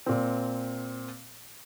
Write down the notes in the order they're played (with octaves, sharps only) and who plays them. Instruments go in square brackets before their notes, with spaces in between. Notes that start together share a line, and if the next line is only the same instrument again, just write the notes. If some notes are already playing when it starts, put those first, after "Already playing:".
[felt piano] A#2 C4